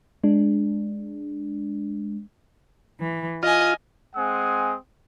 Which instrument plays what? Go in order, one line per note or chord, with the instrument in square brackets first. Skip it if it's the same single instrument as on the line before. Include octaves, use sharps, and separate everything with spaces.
[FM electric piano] G#3 D4
[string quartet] E3
[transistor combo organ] F4 [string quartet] D#5 G#5
[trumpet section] G#3 C4 F#5 G#5 D#6